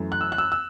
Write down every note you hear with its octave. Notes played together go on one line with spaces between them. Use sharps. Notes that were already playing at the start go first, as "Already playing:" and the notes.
Already playing: F#2 E3 A3
F#6
E6
F#6
E6
E6